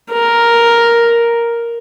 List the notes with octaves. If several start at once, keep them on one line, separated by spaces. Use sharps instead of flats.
A#4